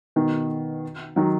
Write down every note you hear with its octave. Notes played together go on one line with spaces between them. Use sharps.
B2 D#3
D#3 F#3